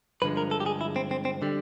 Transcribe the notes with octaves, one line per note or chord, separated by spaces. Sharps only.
G2 D3 F3 G#3 B4
A#4
A4
G4
G#4
E4
C4
C4
C4
D3 G3